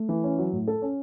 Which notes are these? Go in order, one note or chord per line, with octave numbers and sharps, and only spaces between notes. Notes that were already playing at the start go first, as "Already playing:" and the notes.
Already playing: A3
E3
C#4
F#3
A2
A4
C#4